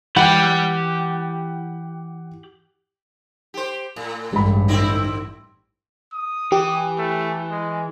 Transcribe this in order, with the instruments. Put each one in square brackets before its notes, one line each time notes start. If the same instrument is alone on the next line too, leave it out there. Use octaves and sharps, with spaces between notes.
[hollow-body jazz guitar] E3 [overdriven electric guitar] G4 B5 [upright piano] F#5 G5
[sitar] G4 C5
A2
[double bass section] A1 G2 [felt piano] G#3 B5
[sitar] D3 C4 E4
[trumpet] D#6
[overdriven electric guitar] E3 [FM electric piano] G4
[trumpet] A3
G#3